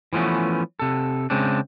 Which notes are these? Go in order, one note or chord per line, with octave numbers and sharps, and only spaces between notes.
E3 F3 A3 B3 C#4
C3 A4
C#3 G#3 C4 D4